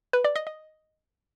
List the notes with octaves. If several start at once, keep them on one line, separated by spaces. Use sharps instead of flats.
B4
D5
D#5
D#5